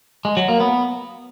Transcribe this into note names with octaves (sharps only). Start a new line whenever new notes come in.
G#3
F#3
A#3
B3